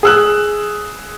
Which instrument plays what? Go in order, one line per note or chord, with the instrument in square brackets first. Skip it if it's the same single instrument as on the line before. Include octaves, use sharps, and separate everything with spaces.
[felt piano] G#4 E6 F#6